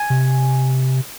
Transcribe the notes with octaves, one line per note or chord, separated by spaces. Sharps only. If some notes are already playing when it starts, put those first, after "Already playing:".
Already playing: G#5
C3